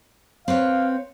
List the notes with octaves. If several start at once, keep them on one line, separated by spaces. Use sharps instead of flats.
C4 B4 C#5 F5